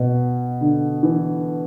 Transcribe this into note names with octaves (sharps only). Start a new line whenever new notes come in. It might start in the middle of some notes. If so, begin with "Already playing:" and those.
Already playing: B2
D3
E3